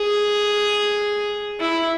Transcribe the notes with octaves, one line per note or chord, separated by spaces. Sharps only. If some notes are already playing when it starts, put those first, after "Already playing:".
Already playing: G#4
E4